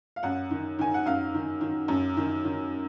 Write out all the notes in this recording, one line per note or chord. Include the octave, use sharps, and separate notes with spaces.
F5
F#2 F#5
D#3
D#3 G#5
F#5
F#2 F5
D#3
D#3
F#2
D#3
D#3